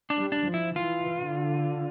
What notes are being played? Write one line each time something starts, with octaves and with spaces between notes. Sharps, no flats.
D4
G3
D4
F3
E4
E3 F4
D3